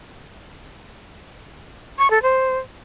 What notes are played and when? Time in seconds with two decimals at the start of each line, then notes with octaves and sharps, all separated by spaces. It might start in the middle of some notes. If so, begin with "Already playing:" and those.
1.99 C#6
2.10 A4
2.22 C5